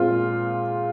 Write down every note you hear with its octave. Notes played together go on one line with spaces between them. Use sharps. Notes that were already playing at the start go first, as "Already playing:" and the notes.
Already playing: A#2 G#3 C4 F4